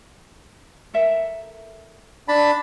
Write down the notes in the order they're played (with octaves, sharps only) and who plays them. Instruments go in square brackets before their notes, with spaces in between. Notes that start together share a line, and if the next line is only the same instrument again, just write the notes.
[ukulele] A4 A#4 E5
[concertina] D4 A5 B5